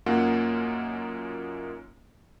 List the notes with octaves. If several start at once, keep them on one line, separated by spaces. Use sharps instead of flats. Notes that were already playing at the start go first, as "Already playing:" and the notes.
F#2 A#3 C#4 D#4 F4 F#5